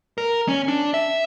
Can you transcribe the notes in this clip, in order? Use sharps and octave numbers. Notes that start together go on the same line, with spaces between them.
A#4
C#4
D4
E5